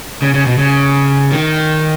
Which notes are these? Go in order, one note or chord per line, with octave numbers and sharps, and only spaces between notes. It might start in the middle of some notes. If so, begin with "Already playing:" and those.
C#3
C#3
B2
C#3
D#3